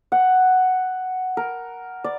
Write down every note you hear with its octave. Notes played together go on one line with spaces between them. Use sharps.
F#5
A#4
D5